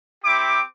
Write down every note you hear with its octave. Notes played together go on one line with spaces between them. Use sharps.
C4 E4 G4 D6